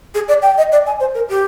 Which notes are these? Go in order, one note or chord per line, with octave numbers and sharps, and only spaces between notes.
G#4
D5
G5
D#5
D5
G#5
C5
A#4
G4